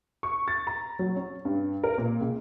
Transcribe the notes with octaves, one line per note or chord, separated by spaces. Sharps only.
C#6
A6
A#5
F#3
C#4
G2
A#4
A#2
C#2